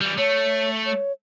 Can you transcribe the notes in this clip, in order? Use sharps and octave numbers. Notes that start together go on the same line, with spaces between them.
E3 G3
A3 C#5
C#5